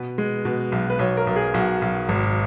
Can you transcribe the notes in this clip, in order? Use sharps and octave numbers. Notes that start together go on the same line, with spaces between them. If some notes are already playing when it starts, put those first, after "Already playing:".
Already playing: B2 B4
G#3
B2
B1
B4
B1 C#5
A#4
B1
G#4
B1 F#4
B1
G#1